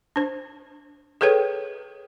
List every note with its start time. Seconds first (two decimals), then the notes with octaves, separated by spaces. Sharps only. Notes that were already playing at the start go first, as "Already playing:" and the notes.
0.16 D4 C5
1.21 G#4 A4 B4 C#5 G5